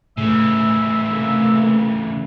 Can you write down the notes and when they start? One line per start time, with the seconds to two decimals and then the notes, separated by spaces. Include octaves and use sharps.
0.18 A2 C#3 E3 E5
1.08 C3 A3 A#3